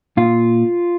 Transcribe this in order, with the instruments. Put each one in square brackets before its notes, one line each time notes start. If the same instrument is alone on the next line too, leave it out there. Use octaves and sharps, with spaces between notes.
[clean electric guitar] A#2 F4